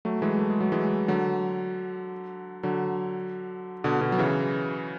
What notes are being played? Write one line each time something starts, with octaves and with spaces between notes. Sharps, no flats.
F#3 A3
E3 G#3
A3
G#3
F#3
E3 G#3
D3 F#3
D3 F#3
B2 D3
B2 D3
F#3
C#3 E3